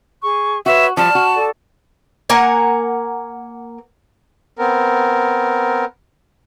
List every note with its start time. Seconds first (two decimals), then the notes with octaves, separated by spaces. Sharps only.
0.23 G#4 C#6
0.66 F#4 B4 C#5 E5 C6
0.97 F3 G3 A5 F6
1.15 F#4
1.35 A4 D5
2.30 A#3 A#4 F#5 G#5
4.57 B3 C4 A#4